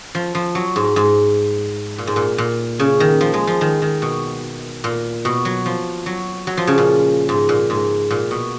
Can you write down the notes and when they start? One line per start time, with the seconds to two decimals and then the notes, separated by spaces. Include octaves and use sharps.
0.15 F3
0.35 F3
0.55 F#3
0.76 G#2
0.96 G#2
1.98 A#2
2.07 G#2
2.16 A#2
2.38 A#2
2.80 C#3
3.00 D#3
3.21 F3
3.34 G#3
3.47 F3
3.61 D#3
3.82 D#3
4.02 B2
4.84 A#2
5.25 B2
5.45 F#3
5.66 F3
6.06 F#3
6.47 F#3
6.57 F3
6.67 C#3
6.78 A#2
7.29 G#2
7.49 A#2
7.70 G#2
8.11 A#2
8.31 B2